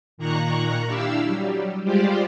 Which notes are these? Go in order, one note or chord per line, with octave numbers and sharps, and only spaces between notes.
A#2 D#3 A#3 A#5 C#6 F#6
D4 E4 G4 F5 E6
F#3 G3
G3 G#3 F4 G4 C5 D5